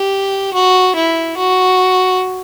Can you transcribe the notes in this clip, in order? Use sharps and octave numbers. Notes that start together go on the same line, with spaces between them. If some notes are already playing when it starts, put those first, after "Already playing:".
Already playing: G4
F#4
E4
F#4